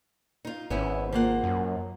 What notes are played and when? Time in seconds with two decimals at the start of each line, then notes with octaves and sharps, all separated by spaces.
0.45 D#4 F4
0.70 G#1 B3 C#4 E4
1.13 F3 A#3 F#5
1.43 F#2